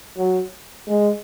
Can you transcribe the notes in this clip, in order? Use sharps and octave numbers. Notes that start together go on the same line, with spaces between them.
F#3
G#3